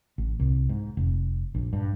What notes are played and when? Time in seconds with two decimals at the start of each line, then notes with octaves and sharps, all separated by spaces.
0.18 A1
0.40 C2
0.69 G#2
0.97 F1
1.55 A#1
1.73 G2